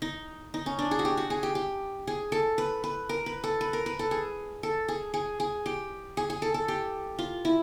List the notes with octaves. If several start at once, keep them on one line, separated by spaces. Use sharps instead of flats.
D#4
D#4
C#4
D4
G#4
F#4
G4
F#4
G#4
G4
G4
G#4
A4
B4
B4
A#4
B4
A4
B4
A#4
B4
A4
G#4
A4
G#4
G#4
G#4
G4
G#4
G#4
A4
A4
G4
F4
E4